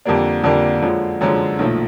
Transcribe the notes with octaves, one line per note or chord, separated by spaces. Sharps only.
F2 D3 G3 A#3 D4
F2 D3 G3 A#3 D4
F#2 D3 F3 G#3
F#2 D3 F3 G#3
B1 A#2 F3 A3